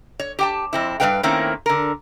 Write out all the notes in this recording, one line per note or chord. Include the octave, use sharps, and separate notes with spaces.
C#5
G4 G5 A5
F2 C4 E4
G2 F3 G3 B4 F5 G5
D#3 A3 A#3 C4 C#4 E4
D3 A#4